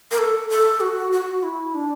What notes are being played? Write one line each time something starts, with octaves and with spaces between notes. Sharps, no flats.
A#4
A4
A4
F#4
F#4
E4
D4